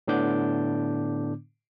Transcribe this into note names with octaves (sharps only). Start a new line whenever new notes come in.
A2 D3 B3 D4 D6 G6